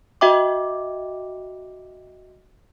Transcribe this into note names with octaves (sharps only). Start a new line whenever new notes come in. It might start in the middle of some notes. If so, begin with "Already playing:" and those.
F#4 D#5 E5 G5 D6